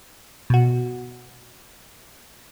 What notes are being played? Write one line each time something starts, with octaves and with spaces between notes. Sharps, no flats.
B2 F#4